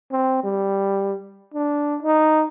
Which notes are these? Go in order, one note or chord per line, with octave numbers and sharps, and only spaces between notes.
C4
G3
D4
D#4